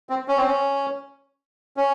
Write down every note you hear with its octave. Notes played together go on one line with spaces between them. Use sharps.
C4
C#4
C4
C#4
C#4